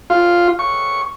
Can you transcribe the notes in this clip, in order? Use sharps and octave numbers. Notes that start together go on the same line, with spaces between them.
F4
C#6